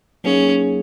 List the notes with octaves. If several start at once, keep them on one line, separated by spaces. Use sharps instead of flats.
F#3 A#3 C#4 D#4 G#4